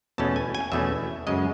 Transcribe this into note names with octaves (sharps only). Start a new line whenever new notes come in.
E2 B2 A3 C#4 A5
G#5
G#5
E2 B2 A3 C#4 E5
F#2 C#3 G#3 D#5